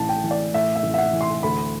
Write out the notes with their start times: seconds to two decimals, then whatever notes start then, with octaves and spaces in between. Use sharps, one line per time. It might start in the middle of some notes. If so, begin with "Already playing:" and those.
Already playing: A1 A2 A5
0.09 G5
0.24 E3
0.31 D5
0.54 A2 E5
0.75 E5
0.83 A1
0.94 E5
0.98 F#5
1.13 E3
1.21 C6
1.43 D2 B5